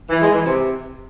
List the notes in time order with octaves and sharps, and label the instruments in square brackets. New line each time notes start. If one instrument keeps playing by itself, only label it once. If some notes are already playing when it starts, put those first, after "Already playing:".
[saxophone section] E3
G#3
E3
C3